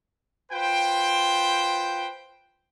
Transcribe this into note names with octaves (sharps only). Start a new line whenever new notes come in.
F4 B4 C5 G5